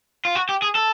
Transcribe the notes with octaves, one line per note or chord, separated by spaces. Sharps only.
F4
F#4
G4
G#4
A4